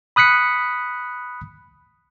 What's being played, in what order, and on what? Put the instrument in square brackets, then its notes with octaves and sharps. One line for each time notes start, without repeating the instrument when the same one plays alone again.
[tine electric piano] B5 D#6 F#6 B6 C#7